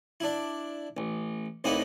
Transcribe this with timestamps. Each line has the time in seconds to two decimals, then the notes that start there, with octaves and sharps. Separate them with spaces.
0.20 D4 E4
0.97 A1
1.64 C2 A2 A#3 D#4 B4